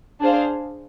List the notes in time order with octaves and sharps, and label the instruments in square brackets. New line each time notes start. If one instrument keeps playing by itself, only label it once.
[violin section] D4 G#4 C5 F5